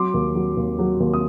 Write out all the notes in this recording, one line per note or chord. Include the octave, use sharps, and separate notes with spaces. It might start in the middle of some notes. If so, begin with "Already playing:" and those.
Already playing: F#3 C6 D6
D#2
F#3
D#2
F#3
D#2
D#6